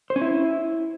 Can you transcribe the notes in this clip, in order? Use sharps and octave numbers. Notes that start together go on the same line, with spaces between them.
C5
C#4
E4